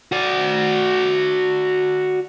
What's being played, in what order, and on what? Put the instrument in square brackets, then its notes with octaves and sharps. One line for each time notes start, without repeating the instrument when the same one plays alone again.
[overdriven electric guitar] F#4 D5